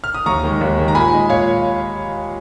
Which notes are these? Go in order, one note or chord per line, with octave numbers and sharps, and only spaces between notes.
F6
D#6
D#2 A#5 C#6
D#3 G#3
D#2
D#3 G#3
A#5
A#2 G#5 B5
G#3 D#4
A#2 C#5 F5